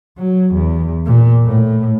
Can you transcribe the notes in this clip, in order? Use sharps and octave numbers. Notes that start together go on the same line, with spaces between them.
F#3
E2
A#2
A2